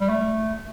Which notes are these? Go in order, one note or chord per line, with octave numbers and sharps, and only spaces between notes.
G3
A3